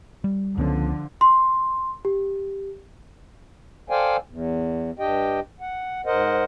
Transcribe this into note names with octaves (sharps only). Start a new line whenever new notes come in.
G3
C#2 D3 F3 B3 C#4
C6
G4
A4 C5 D5 F5 G5 G#5
E2
G2 D4 G4 D#5 G5
F#5
G#2 A#4 C5 D#5 F#5